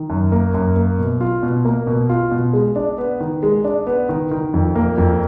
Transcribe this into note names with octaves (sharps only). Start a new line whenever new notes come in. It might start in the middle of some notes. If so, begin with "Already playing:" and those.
Already playing: D#3
F#2
A#3
F#2
A#3
B2
F4
B2
A#3
B2
F4
B2
G#3
D4
B3
D#3
G#3
D4
B3
D#3
D#3
F2
A#3
F2